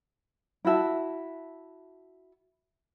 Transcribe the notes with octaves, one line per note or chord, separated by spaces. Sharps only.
E4 F#4 E5 A5